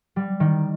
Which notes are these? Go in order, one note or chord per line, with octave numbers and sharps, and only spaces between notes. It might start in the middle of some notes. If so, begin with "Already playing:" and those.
G3
D#3